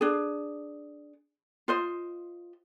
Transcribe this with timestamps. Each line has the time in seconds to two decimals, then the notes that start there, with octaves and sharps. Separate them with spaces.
0.01 D4 G#4
1.68 F4 C5 D#5